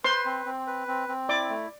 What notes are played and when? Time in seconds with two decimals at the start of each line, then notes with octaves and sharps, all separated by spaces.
0.04 B4 C5 C6
0.25 C4
0.46 C4
0.67 B4
0.88 C4
1.09 C4
1.29 E4 D5 D6
1.49 A3